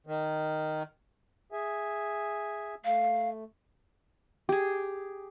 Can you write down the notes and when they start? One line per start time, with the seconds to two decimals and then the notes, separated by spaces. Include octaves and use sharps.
0.07 D#3
1.52 G#4 E5 G#5
2.85 A3 F5
4.49 G4 G#4